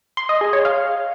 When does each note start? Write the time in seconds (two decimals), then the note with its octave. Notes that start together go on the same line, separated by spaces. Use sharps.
0.17 C6
0.29 D#5
0.41 G#4
0.53 C#5
0.65 F5